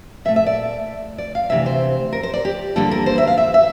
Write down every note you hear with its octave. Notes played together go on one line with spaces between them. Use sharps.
A#2 A3 E5
E5
D5
D5
F5
D2 C3 E3 E5
C5
A#4
C5
D5
G4
E2 D3 G3 A#3 A4
A#4
C5
E5
F5
E5
E5